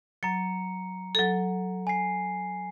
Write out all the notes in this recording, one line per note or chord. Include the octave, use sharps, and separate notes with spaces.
F#3 A#5 C#7
F#3 A4
G#5 C7